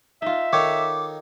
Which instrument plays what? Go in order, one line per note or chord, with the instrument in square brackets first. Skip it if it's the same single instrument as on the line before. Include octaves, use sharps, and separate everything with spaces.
[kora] D#4 F4 [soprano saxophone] E5
[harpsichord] D#3 D#4 A4 [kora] C#5 [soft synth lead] D6